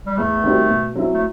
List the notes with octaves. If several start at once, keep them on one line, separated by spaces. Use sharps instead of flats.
G3
E2 A3
D#3 G3 C4 F#4
B2
F#3 C4 E4
A3